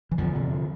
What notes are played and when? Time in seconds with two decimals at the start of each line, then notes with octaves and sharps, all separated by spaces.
0.11 E3
0.18 E2 D3 F3
0.35 C3